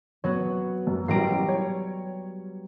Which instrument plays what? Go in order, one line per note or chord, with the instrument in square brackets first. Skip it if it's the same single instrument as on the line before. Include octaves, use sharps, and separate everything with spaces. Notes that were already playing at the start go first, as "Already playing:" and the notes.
[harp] F#3 B3 [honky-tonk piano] C#5
[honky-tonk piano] F#2
[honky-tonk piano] A1 A#4 D7 [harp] G3 A#5 C7
[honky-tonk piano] C#5